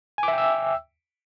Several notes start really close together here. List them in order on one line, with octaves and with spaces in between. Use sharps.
G#5 D6 E5 G5 E6